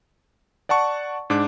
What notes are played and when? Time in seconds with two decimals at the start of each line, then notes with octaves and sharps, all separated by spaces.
0.69 D5 F#5 A5 C#6
1.30 G#2 D4 D6